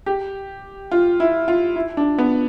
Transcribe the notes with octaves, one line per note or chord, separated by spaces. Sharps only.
G4
F4
E4
F4
E4
D4
B3